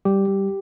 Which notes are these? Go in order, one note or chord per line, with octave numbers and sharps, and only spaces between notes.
G3 G4
G3